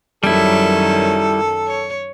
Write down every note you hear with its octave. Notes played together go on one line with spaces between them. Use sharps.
F#2 D#3 F#3 G3 E4 A4
C#5